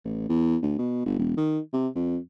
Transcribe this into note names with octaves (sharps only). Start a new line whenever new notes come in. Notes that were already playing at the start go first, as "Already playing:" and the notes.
A1
E2
D2
B2
G1
E1
D#3
C3
F2